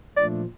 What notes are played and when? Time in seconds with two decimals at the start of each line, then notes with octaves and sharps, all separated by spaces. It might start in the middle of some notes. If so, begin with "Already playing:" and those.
0.17 A#2 F3 A3 D4 D5